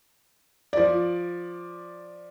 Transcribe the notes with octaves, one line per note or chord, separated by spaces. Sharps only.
F3 D5